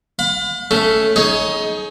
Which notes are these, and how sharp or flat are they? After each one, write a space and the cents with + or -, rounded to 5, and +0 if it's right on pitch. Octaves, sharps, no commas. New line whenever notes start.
F5 +45 B5 +35
A3 +0 C#4 +10 A4 +0
D#4 +20 G#4 +30 C#5 +0